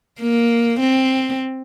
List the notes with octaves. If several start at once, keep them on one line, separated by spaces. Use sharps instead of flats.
A#3
C4